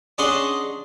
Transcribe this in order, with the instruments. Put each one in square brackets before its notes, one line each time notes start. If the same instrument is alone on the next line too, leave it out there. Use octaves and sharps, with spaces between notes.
[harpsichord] C#4 D4 G#4 D#5 F#5 C6